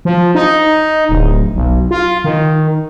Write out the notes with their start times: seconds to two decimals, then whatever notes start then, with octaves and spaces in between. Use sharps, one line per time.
0.05 F3
0.35 D#4
1.09 D1
1.55 B1
1.91 F4
2.24 D#3